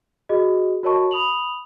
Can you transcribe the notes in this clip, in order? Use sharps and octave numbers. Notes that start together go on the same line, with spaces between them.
F#4 G#4 D#5
F#4 A#4 C#5 D#5 A5 C#6
B5 D#6 F7 F#7